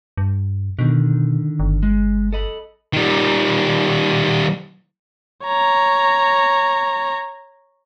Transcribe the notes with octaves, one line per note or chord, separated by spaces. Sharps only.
G2
B2 D3 D#3
G1
G#3
A4 D#5 B5
D#3 G3
C#5 A#5